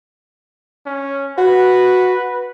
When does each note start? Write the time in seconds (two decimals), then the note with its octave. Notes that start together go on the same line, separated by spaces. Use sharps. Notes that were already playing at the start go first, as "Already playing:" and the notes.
0.86 C#4
1.38 F#4 B4